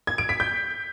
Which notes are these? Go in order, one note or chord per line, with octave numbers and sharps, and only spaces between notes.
G#6
D7
B6
G6